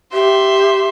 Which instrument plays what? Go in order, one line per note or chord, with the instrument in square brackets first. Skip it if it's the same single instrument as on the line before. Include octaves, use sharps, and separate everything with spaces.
[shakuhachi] G4 [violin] E5 C6